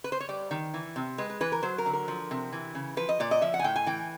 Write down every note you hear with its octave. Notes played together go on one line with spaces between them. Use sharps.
B4
C5
C#5
G3 D5
D#3
E3
C3
G#3 B4
B4
E3 B4
A#4
F#3 C5
A#4
D3
A#4
F3
C3
E3
C#3
F3 B4
D#5
A#2 D5
D#5
F3 E5
F#5
G#5
A2 G5
G#5
E3 G5